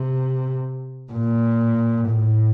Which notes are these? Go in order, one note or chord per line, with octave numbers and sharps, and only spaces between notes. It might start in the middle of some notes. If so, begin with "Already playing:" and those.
Already playing: C3
A#2
A2